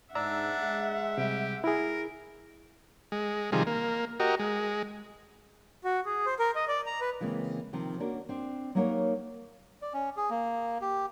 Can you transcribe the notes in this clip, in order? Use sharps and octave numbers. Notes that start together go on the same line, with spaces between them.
G#2 D4 D5 E5 F#5 A#5 E6
G#3
C3 G3 G4
E4 G#4 A#4
G#3
C3 D#3 F3 G3 G#4
A#3
F#4 G4 A#4 D#5
G#3
F#4
G#4
C5
A#4
D#5
D5
A#5
B4
C#3 E3 G#3 A#3 C4
C3 D#3 F3 C4
A#3 C#4 D4 F#4 A#4
C4 D4
F#3 G3 A#3 D#4 A#4 C#5
D5
C#4
G#4
A#3
G4